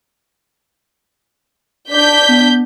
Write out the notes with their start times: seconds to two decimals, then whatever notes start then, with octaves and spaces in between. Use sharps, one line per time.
1.91 D4 D6 G6 B6
2.29 B3